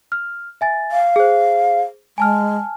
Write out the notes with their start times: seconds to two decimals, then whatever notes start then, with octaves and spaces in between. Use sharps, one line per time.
0.12 F6
0.61 E5 G#5 A6
0.92 F5
1.16 G#4 C5
2.18 G#3 G#5 A5 F6